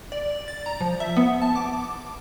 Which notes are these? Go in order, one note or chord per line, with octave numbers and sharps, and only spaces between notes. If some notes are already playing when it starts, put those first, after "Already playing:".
D5
A6
A#5
F3
E5
B3
A5
D6